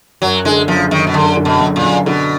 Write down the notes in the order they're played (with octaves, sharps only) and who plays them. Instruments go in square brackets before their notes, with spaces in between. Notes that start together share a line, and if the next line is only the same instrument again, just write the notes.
[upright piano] F#2 [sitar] F#3
[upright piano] D3 [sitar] G#3
[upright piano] F#1 [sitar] F3
[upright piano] F#1 [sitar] D#3
[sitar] B2
[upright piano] F#2 [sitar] D3
[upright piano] D3
[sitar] B2
[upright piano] F#1
[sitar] A#2
[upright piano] F#1
[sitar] B2 [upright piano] D3